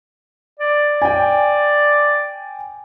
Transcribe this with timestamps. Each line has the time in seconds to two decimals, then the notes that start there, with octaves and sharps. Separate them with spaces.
0.60 D5
1.02 G5 G#5